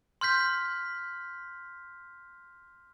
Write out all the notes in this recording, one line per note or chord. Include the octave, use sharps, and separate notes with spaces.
C6 F6 G6 B6